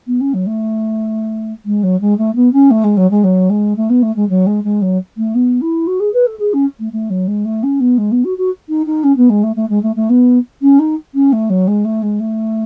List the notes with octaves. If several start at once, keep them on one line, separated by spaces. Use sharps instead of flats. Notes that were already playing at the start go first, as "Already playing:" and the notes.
B3
C#4
F#3
A3
G#3
F#3
G#3
A3
B3
C#4
A3
G#3
F#3
G#3
F#3
G#3
A3
B3
A3
G#3
F#3
G#3
G#3
F#3
A3
B3
E4
F#4
G#4
B4
A4
G#4
C#4
A3
A3
F#3
G#3
A3
C#4
B3
G#3
B3
F#4
F#4
D#4
D#4
C#4
B3
G#3
A3
A3
G#3
A3
A3
B3
C#4
D#4
C#4
A3
F#3
G#3
A3
G#3
A3